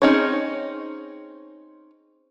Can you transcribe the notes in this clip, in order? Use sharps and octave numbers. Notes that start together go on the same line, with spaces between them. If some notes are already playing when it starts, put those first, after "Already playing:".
C4 C#4 D#4 G#4 C#5